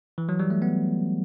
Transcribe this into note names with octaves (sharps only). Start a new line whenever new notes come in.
E3
F#3
G3
A3
B3